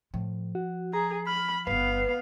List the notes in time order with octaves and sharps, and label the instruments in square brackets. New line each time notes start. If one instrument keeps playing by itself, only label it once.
[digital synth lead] A2 [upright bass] F3
[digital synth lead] F#4
[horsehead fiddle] G#4 [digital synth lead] A#5
[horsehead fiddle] B5 [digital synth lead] F6
[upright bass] G1 G2 [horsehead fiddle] B3 F5 [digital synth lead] B4